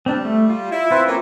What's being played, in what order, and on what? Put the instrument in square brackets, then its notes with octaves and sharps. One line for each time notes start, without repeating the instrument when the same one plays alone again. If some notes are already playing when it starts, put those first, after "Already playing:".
[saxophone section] G3 [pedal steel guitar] C4 D4
[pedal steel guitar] A3
F4
[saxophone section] E4
[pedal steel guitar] C4 F4 [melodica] B4 C5 E5
[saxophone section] F#3 A3 C#4 [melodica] A#3